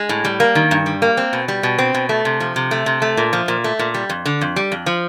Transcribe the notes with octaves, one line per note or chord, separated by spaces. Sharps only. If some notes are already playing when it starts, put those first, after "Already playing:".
Already playing: G#3
A2
G3
A#3
D#3
G2
G3
A#3
C4
B2
G3
B2
C4
B2
A3
C3
F3
C3
A3
C3
A3
A#2
F3
A#2
A3
A#2
G3
F2
D3
F2
G3
F2
F3